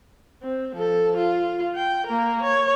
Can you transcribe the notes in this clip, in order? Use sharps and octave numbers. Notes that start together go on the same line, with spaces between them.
C4
F3 A4
F4
G5
A#3 A#4
C#5